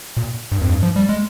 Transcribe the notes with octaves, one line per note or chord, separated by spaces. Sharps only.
A#2
G2
F2
G2
F3
G3
G#3